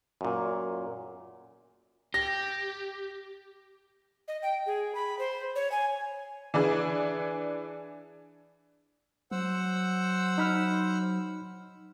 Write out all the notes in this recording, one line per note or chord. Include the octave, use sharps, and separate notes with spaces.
F#2 A#2
G4 A#6
D#5
G5
G#4
B5
C5
C#5
G#5
E3 D4 G#4
F#3 C5 F#5 E6
D#4 B5 F6